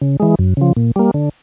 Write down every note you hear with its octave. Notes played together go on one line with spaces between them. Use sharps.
C#3
E3 G#3
F#2
C#3 F3
A#2
G3 A#3
D3